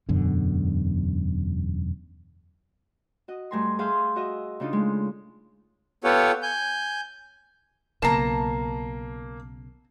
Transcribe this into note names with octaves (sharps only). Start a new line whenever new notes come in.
E1 F#2 B2 D3
F#4 D#5
G2 A3 G#5 A#5 C6
G#4 E5 F5 C6 G6
F#4 D#5 E5
C#3 D4 D#4 F4 D#6
G#3 A3
B3 F4 G4 A4 C#5 F#5
G#5 G6
B1 C#3 A#3 A5 A#5 C7